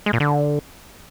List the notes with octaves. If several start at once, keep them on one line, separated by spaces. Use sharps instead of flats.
G#3
A#2
D3